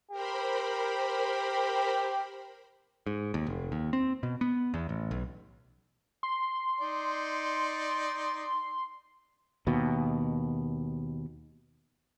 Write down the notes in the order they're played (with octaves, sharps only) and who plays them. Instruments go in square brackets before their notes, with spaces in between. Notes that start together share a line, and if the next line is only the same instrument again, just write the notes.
[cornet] G4 [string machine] A#4 C5 B5
[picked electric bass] G#2
D#2
F1
D#2
C4
B2
B3
E2
A1
B1
[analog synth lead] C6
[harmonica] D#4 D5
[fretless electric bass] D#2 B2